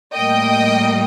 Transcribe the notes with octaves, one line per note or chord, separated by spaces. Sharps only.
A2 G3 A#3 D#5 G5